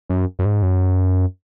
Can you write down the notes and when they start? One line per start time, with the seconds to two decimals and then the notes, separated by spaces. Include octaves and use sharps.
0.09 F#2
0.39 F#2
0.45 G#2
0.62 F#2